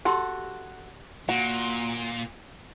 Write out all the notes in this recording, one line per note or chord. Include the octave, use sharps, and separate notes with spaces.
F#4 G4 A4 C6
A#2 F#4